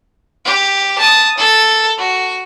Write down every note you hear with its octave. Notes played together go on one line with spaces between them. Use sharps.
G4
A5 D#6
A4
F#4